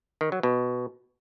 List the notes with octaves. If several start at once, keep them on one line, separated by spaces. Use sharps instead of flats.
D#3
F#3
B2